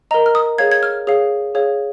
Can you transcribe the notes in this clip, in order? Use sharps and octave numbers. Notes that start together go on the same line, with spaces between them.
A#4 D#5 A#5
F6
D#6
G#4 C#5 F5 G#6
G#6
F6
G#4 C#5 F5
G#4 C#5 F5